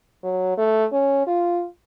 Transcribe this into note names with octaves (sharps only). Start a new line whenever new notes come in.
F#3
A3
C#4
F4